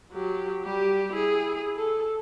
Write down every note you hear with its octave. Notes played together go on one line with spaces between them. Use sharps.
F#3 G4
G3 G4
E4 G#4
A4